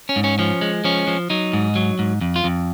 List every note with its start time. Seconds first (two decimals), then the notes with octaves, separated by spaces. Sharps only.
0.09 C#4
0.16 G#2
0.24 C#4
0.39 F3 C#4
0.61 G#3
0.84 F3 C#4
1.08 F3
1.30 F#3 D#4
1.53 G#2
1.76 F#3
1.99 G#2
2.21 F2
2.36 F4
2.44 F2